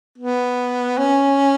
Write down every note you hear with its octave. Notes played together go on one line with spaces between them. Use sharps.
B3
C#4